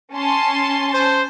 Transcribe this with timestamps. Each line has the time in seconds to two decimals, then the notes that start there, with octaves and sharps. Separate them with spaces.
0.13 C#4 A5 C6
0.94 C5